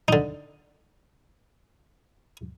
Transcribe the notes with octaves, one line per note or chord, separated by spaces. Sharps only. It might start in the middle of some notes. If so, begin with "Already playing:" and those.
D3 D#4